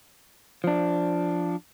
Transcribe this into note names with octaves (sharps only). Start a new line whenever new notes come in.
F3 D4